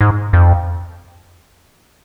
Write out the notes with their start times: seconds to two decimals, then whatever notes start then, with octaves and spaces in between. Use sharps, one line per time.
0.01 G#2
0.33 F2